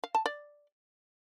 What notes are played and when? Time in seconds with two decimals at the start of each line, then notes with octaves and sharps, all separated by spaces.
0.04 F5
0.15 A5
0.26 D5